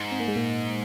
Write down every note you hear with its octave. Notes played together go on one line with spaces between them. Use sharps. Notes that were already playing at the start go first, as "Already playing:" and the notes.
Already playing: G#2
C4
A#3
G#3
A#2 A#3